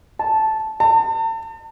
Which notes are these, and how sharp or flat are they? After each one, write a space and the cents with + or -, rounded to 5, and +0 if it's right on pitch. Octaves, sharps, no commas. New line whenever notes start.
A5 -10
A5 +40